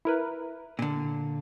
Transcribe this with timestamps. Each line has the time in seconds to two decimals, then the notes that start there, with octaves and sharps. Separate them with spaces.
0.05 E4 A#4 B4
0.79 A#2 D3